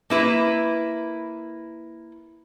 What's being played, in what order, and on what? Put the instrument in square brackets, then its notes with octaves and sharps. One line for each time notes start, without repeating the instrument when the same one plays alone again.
[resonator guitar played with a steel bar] A#3 E4 B4